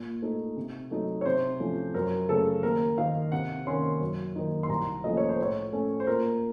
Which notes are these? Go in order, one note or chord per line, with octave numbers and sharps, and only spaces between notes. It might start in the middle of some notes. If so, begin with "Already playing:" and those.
Already playing: A#2
A3 D#4
C3
F#3 A3 D#4
C#5
C3 C5
F3 A3 C#4
F#2 A#4
C#3 A3 A4
D#2 A#4
D#3 A#3 D#4 F5
C3 F#5
D#3 A#3 C#4 C6
F#2
D#3 A#3 D#4
C6
C2 A#5
A#2 F3 A3 C#4 D#5
C#5
C5
A2 C#5
A3 C#4
C5
A#2 A#4